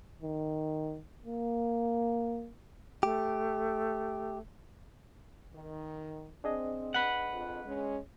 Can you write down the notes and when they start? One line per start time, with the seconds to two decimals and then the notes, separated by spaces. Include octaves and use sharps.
0.22 D#3
1.26 A#3
3.03 A3 G4
5.54 D#3
6.44 C4 D4 G#4 D#5
6.94 B4 F#5
7.31 F2
7.65 G#3 C#4